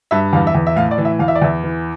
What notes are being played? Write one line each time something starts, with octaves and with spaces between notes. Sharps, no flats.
G2 E5
E2 F5
E5
E2
E5
A2 F5
D5
E3
E5
E2 F5
E5
D5
E2 E5
E3